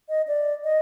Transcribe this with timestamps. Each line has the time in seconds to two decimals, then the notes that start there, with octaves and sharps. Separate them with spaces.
0.09 D#5
0.28 D5
0.64 D#5